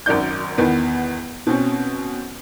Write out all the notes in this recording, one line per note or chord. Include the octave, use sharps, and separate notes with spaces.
G#1 F#2 D5 G6
E2 D#3 B3
B2 C4 C#4